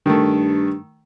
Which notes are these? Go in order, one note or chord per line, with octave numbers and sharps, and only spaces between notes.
G2 D#3 A3